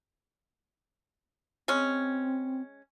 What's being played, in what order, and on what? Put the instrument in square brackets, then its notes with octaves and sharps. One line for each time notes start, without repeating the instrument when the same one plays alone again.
[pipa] G#3 C#4 [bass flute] C4